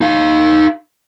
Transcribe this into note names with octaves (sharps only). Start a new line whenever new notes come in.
D#4 F5